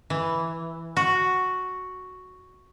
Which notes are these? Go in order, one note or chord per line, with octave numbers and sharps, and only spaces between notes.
E3
F#4